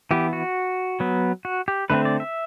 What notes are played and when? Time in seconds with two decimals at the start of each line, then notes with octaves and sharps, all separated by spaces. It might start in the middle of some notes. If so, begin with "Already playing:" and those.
0.11 E3 B3 G4
0.33 F#4
1.00 F#3 B3
1.45 F#4
1.68 G4
1.90 D3 A3 C4 B4
2.05 D5
2.20 E5